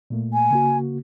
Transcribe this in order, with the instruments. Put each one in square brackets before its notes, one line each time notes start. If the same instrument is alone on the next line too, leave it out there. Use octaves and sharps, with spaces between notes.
[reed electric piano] A#2 A3 A#3
[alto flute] G#5
[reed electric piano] C#3 A#3 F#4